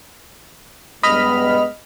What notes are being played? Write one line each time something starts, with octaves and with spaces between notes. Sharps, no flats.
G2 G#3 B3 D#5 B5 F6